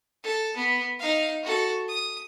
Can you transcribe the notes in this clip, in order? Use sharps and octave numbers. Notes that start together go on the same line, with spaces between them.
A4
B3
D#4 F5
F#4 A4
D#6